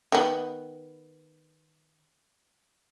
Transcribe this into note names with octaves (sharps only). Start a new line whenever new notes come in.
D#3 B3